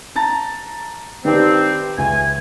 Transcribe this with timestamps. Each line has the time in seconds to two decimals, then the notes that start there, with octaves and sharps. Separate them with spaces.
0.16 A5 A#5 A6
1.25 G2 D#3 C4 G4
1.98 C#2 E3 G#5